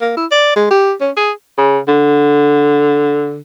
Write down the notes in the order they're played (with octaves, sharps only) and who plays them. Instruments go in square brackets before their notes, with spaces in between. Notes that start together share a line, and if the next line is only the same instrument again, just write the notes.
[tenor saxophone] A#3
E4
D5
G#3
G4
C#4
G#4
[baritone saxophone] C#3
D3